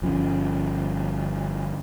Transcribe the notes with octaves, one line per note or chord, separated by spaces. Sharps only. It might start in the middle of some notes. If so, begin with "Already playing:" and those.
G1 F3 C#4